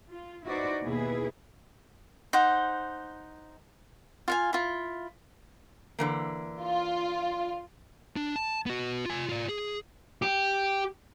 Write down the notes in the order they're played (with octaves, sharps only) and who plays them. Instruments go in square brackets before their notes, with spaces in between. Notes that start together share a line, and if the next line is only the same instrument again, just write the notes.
[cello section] F4
D#4 E4 F#4 B4 C5 D5
D#2 B2 E4 G#4 B4
[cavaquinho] D#4 C5 F#5
F4 F5 G#5
E4 F4
[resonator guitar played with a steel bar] D3 E3 A#3
[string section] F4
[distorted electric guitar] D4
A5
B3 F#4
F4 G#5
F4 D5
G#4
G4